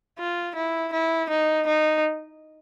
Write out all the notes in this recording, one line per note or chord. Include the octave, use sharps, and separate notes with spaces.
F4
E4
E4
D#4
D#4